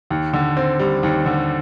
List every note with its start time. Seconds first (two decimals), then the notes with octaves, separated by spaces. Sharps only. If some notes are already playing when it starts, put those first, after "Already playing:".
0.10 D#2
0.33 D3
0.57 C4
0.79 G3
1.03 D#2
1.26 D3